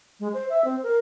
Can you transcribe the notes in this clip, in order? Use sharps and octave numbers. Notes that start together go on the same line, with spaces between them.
G#3
C5
E5
C4
A#4